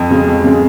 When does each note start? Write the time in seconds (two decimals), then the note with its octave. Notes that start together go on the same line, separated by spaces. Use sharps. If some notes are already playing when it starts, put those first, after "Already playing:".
Already playing: F2
0.10 C#3 G#3
0.28 F2
0.44 C#3 G#3